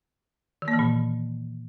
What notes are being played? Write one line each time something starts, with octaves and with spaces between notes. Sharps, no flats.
D#3
A#3
E3
A#2